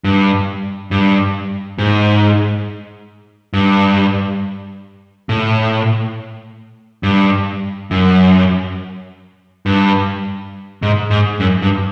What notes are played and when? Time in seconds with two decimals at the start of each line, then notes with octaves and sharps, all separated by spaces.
0.04 G2
0.91 G2
1.78 G#2
3.53 G2
5.29 A2
7.03 G2
7.91 F#2
9.66 G2
10.82 G#2
11.11 G#2
11.40 F#2
11.62 G2